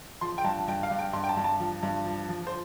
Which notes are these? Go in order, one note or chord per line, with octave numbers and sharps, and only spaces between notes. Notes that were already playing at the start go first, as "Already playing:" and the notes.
F3 C6
G5
G2 A5
G2 G5
F5
G2
G5
G2 C6
G5
A5
G2
A5
F3
G2
F3
F3
C5